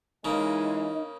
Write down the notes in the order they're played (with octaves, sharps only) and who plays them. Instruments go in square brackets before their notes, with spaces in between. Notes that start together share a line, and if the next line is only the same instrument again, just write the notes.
[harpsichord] C#3 A#3 [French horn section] E3 G#3 [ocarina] D#4 [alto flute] D#5